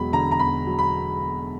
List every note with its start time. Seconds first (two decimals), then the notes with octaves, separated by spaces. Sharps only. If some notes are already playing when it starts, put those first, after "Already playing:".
Already playing: E1 F#3 B5
0.13 D3 A#5
0.31 A#5
0.39 E2 B5
0.67 F#3
0.79 B5